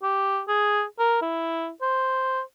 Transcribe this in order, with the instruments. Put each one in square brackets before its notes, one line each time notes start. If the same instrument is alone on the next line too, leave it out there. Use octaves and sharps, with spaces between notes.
[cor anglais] G4
G#4
A#4
E4
C5